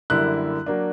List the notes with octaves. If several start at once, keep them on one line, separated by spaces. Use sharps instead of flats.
F#2 D3 G3 A#3 E4 F#6
F#3 A#3 D4